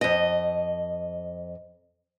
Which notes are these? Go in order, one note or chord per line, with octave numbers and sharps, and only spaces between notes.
F2 D#5